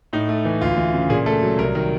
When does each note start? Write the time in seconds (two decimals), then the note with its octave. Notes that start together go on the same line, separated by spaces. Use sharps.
0.13 A2 D#4
0.29 A3
0.45 E3
0.61 D2 F4
0.77 E3
0.94 C#3
1.10 A#2 G#4
1.26 A3 A4
1.42 F#3
1.58 C2 A#4
1.75 D#3